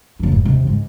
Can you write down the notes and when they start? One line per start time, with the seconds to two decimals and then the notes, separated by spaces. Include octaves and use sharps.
0.20 F1 E3
0.32 G#2
0.45 D#2 C3
0.67 G#2 G#3